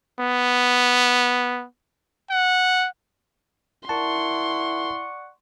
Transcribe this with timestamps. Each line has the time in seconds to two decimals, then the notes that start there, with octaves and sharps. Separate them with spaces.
0.20 B3
2.30 F#5
3.89 E4 A#4 D5 F#5 A5 C6 C#6